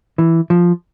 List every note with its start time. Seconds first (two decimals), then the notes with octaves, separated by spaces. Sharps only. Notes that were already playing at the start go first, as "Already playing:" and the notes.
0.18 E3
0.50 F3